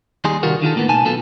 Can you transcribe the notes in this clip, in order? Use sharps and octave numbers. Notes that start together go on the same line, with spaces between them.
D#2 G3 D#4 G#4 C6
C3 D#3 G3 F4 F#4 A#4
D3 D#3 F4 A4
A2 A#3 B3
B2 D#4 G#5 A5
B1 F#3 B3 F4 A4 A5